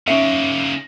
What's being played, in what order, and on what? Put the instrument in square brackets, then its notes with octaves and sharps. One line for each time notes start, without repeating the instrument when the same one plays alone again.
[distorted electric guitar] C#3 A#3 [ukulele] C#4 D#4 E5